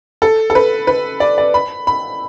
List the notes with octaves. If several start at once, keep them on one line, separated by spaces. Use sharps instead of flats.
A4
A4
B4
B4
D5
D5
B5
B5